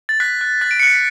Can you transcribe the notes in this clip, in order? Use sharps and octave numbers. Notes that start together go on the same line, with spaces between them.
A6
F#6 B6
F#6
F#6 A6
D7
C#7
F#6 B6